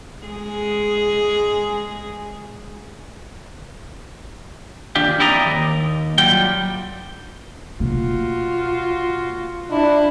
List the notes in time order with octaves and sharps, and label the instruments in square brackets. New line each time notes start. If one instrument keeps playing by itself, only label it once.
[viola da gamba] G#3 G#4
[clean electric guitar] D#2 D4 F4 G4
F2 E4 G4 D5 D#5 A#5
D#2
F#3 G3 F4 G5
[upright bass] B2 A#3 [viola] F4 F#4
[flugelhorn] D4 [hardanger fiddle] E4